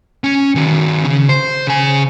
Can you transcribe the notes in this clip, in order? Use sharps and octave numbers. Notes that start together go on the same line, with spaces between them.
C#4
D#3 F#4
C#3 C#4
C5
C#3 G#5